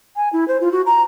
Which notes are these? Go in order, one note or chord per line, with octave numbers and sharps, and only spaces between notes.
G#5
E4
C5
F4
F#4
A#5